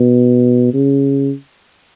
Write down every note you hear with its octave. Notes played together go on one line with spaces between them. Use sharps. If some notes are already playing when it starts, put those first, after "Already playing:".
Already playing: B2
C#3